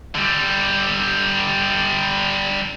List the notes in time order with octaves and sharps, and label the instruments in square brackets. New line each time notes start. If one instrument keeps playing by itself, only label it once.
[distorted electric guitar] D3 G3